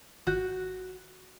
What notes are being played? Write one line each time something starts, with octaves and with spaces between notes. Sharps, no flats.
G#1 F#4 F#6 G6